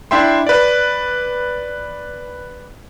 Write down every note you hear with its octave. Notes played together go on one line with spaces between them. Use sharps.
D4 E4 E5 G5 C6
B4 D5